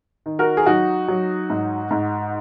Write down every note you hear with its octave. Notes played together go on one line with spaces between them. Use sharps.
D#3
F#4 A#4
G#4
F#3 D#4 F#4
F#3
G#2
G#2